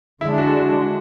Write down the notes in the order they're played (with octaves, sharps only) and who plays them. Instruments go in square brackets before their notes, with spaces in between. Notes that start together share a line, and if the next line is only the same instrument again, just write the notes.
[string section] D3 G#3 D4 [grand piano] E4
[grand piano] F#4